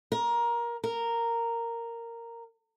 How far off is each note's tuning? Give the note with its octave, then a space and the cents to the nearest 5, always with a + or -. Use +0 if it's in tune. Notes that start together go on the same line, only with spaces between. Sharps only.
A#4 +20
A#4 -10